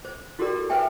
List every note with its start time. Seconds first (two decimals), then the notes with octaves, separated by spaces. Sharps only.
0.05 C5
0.39 E4 F#4 G4 A4 A#4 D5
0.69 A4 B4 C5 E5 G5 G#5